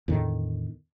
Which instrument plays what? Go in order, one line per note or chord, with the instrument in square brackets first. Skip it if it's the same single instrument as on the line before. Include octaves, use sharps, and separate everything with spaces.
[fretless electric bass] E2 A2 D3 D#3